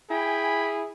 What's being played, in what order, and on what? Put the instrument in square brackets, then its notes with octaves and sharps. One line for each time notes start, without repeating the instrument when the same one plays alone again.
[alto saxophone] E4 [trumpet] G#4 [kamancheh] G5 G#5 [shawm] B5